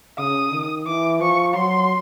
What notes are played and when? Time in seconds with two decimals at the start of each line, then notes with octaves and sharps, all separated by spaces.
0.19 C#3 D#6
0.52 D#3
0.86 E3 D6
1.20 F3 C#6
1.55 F#3 C6